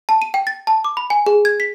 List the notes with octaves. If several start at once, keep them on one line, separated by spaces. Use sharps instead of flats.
A5
D#7
G5
A6
A5
D6
B5
G#5
G#4
G#6
B6